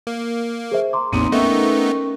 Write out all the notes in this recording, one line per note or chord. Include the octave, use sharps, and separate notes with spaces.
A#3
G#4 C5 E5
A#5 C6 D6
A1 E2 A#3 C4 D#4
A3 B3 C#4 D#4 A#4 B4 E5 G5